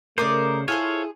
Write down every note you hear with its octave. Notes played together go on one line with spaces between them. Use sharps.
C#3 A3 A#4 C5 D5 D6 D#6
E4 F4 G#4 A4 C5 C#5